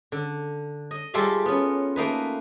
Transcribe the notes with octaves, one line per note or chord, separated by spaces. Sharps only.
D3
D#5
G3 G#3 F4 A4 D5 E5
B3 C#4
A3 A#3 D#4 B4